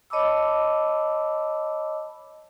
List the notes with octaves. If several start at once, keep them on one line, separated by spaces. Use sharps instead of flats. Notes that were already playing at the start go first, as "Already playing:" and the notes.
C#5 D#5 A5 B5 D6 E6